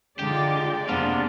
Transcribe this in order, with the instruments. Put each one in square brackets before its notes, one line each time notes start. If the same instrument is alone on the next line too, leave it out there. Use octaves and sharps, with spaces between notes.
[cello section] D3 D#4 F4 [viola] G#3 D5 [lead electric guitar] G4
[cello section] F2 A#3 [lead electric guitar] C3 F4 [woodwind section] F3 B3 D4